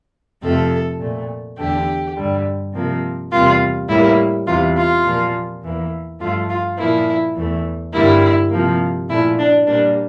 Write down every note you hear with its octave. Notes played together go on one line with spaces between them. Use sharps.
F2 C3 F3 A3 A4
A#2 A3
E2 D3 A3 G4
G2 D3 G3
C3 F3 A#3
E2 C3 G3 A#3 F4
A2 G3 A#3 E4
E2 C3 E3 F4
F4
A#2 F3 A#3
E2 E3 A#3
G2 F3 A3 F4
F4
A#2 F3 A#3 E4
E2 E3 A3
G2 D3 G3 A#3 E4
C3 F3 A#3
A#2 F3 A3 E4
D4
A#2 G3 A#3 D4